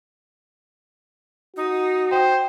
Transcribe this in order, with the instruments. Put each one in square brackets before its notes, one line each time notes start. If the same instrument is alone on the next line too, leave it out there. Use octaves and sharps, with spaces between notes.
[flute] D#4 [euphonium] F#4
[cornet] C5 [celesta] G5